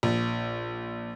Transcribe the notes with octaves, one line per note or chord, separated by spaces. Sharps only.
A#1